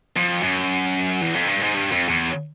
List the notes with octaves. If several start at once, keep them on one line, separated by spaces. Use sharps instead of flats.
F2
F#2
E2
F2
G2
G#2
G2
F2
E2